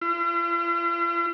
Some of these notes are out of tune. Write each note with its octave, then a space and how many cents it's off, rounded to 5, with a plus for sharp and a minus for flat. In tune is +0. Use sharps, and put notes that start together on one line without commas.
F4 -45